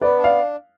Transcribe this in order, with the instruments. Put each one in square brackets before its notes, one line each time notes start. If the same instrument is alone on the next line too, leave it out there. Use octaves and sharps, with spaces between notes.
[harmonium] B3 [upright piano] B4 D5
[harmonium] D4
[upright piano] D5 F5